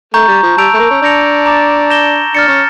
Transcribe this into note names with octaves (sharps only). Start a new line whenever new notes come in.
A3 A#5 C#6 G6
G3
F3
G3 A5 E6 G6 D7 F7
A3
A#3
C#4
D4 G6 A#6 C#7 F7
A#5 D6 A6 E7
G6 A#6 E7 G7
D4 F6 A6 C#7
C#4